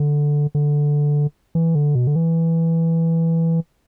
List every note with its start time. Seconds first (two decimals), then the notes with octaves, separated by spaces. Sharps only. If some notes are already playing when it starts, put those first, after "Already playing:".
Already playing: D3
0.55 D3
1.55 E3
1.75 D3
1.95 B2
2.07 D3
2.16 E3